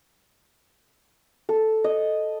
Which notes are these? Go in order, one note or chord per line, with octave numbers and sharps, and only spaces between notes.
A4
D#5